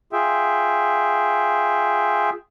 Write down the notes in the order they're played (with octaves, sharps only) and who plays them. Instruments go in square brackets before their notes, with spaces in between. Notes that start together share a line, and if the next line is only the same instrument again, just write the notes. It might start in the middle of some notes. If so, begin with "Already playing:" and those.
[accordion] F4 G#4 E5 G5